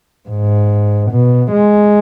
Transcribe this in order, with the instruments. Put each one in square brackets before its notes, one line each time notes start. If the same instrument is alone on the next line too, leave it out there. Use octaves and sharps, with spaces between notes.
[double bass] G#2
B2
G#3